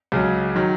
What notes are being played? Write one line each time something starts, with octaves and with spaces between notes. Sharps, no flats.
C#2 C#3 F#3
D#3 F#3